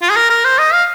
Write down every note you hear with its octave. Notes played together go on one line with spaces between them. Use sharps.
F4
G#4
A#4
A#4
C5
D#5
F5